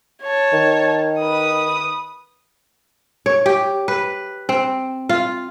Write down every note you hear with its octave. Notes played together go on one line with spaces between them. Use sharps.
C#5 A5
D#3
B4 D#6
C#5
G4
B4
C4
F4